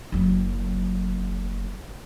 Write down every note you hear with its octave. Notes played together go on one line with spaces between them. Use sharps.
F#1 F#3